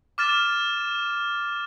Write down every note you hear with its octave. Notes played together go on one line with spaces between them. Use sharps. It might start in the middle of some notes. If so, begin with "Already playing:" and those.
D6 F6 A6 E7